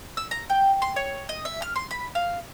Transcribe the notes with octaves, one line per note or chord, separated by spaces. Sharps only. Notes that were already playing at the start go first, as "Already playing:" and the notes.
E6
A#5
G5
C6
C#5
D#5
E5
F6
C6
B5
F5